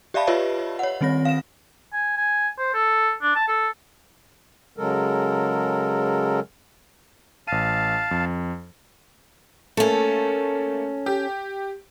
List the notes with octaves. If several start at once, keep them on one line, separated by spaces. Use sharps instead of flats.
G4 D5 E5 F5 A5 B5
F4 G4 B4 C#5 D#5 E5
C#5 F#5
D#3 G3 C4 C#5 A#6
F5 E7
G#5
G#5
C5
A4
D4
A5
A4
C#3 F#3 G#3 A4 A#4
A1 F5 A5 D#7
F2
A3 A#3 C#4 A4
G4